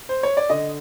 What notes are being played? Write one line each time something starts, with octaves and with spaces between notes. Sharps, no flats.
C5
C#5
D5
D3 D#5